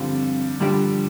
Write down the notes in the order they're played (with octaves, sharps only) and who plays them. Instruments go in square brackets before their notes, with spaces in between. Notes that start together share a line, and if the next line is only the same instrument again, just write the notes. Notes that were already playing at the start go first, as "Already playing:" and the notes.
Already playing: [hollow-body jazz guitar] G2 F3 C4 F4 [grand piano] D3 G3
[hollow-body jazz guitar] G2 F3 D4 G4 [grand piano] D3 G3